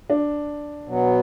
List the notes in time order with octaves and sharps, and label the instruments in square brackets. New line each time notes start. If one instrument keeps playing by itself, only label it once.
[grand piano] D4
[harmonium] B2 F#3 B3